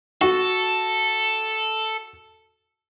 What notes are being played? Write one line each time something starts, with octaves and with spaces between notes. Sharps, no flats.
F#4 A4